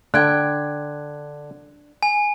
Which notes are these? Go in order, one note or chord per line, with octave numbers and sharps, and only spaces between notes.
D3 D4 G5 F#6 G#6
G#5